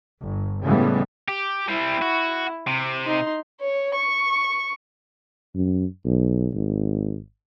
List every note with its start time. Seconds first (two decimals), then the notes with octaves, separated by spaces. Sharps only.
0.20 G1
0.64 A2 C#3 E3 G3 G#3 B3
1.28 G4
1.69 G3 C4 E4
2.02 F#4
2.67 C3
3.06 D#4 C6
3.61 C#5
3.95 C#6
5.55 F#2
6.05 B1
6.54 G#1